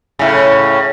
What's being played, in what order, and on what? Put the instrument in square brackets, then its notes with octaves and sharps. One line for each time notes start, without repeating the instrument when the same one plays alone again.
[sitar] A2 C#3